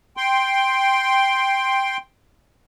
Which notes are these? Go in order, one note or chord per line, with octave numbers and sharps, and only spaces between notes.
G5 C6